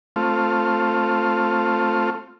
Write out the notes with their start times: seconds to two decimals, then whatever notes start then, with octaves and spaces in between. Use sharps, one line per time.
0.16 A3 C4 F4